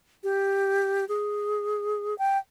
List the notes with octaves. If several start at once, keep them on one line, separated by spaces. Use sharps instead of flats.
G4
G#4
G5